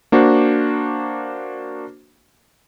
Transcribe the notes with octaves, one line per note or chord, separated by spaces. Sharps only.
A#3 D4 F#4 C5